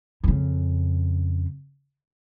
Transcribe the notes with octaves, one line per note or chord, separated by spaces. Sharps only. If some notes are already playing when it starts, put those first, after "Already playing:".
F2 C#3